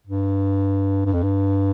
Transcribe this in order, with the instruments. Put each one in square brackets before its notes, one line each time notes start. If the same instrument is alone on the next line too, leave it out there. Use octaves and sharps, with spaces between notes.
[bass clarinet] G2
G2
F2
G2